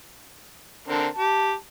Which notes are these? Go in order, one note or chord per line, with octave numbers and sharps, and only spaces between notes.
D3 C4 A#4 A5
G4